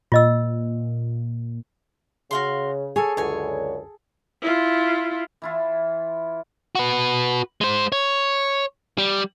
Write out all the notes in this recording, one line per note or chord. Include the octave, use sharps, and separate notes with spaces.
A#2 F4 D#5 E6
C#3 F#4 F5 C6
G#4 A4 C#5 G#5
C#2 F#2 D3 C#5 G#5
E4 F4
E3 E4 F4
F#4 B4
G#3 C5
C#5
G3